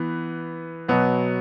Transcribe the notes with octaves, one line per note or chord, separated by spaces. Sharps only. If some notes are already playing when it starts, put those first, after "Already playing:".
Already playing: E3 B3
B2 F#3 B3